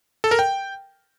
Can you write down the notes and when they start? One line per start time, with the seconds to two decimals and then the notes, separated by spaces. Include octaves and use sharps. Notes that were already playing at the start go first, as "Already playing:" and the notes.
0.24 A4
0.31 A#4
0.39 G5